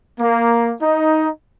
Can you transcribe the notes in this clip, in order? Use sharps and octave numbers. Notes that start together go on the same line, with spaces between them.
A#3
D#4